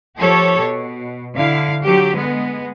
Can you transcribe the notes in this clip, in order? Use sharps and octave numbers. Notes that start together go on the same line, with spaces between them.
F3 G4 A4 C#5
B2
D3 E4 F5
D3 F#3 G4
G#3 B3